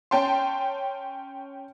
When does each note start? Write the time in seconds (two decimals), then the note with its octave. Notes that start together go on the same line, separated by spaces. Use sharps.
0.11 C#4 G5 A5 C6